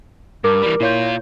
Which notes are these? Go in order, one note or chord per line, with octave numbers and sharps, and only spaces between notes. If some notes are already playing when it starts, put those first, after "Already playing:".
G2 A#4 D6
E3 G3
A#2 E4 F4 C#5 G6